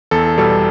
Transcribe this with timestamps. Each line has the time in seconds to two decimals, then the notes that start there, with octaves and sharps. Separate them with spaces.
0.11 E2 A4
0.37 B2 G3 A4